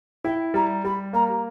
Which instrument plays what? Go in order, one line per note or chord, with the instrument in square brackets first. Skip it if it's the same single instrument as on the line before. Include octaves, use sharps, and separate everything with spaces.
[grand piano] E4 [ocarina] G5
[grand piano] G3 [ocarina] A#5
[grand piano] G3 [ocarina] B5
[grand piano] A#3 [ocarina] A#5